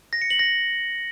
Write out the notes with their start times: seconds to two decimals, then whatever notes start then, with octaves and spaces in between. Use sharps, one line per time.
0.13 A#6
0.22 C#7
0.30 F#7
0.39 A#6